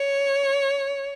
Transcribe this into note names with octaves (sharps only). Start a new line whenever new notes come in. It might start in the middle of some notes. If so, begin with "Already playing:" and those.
Already playing: C#5